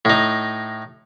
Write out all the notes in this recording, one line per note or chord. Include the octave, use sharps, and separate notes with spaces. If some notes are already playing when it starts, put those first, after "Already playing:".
A2 D#4